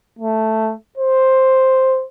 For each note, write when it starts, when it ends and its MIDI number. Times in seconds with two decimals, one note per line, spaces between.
0.19 0.74 57
0.98 2.05 72